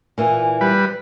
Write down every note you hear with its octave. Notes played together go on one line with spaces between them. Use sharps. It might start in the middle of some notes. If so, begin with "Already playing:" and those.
A#2 E3
G3 B4